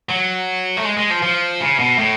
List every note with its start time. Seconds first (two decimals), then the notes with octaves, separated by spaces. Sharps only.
0.09 F#3
0.77 A3
0.85 G#3
0.97 G#3
1.10 F3
1.22 F3
1.60 C#3
1.79 B2
1.98 A2